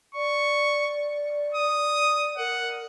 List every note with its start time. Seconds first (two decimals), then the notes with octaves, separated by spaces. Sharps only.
0.15 D5 C#6
1.54 D#6
2.38 A#4 F#5